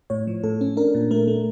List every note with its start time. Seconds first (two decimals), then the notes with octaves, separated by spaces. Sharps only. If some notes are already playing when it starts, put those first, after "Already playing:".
0.10 A2 C#5
0.27 F3
0.44 A2 A4
0.61 C#4
0.77 D4 A#4
0.95 A#2
1.11 A3 A#4
1.28 A3